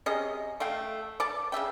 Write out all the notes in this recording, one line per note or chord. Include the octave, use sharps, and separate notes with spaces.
C3 C#4 G#4 D#5
A3 F5 G5
D5 A5
C#3 C4 E5 G5